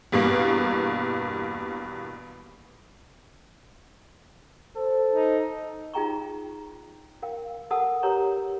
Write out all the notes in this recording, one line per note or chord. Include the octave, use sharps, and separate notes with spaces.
E2 G2 B2 A#3
A4 C5
D#4
D#4 F4 G#4 G5 A#5 C#6
A#4 F5 G5
A4 A#4 F#5 A5 D#6 E6
G4 A#4 B4 C#5 A#5 C#6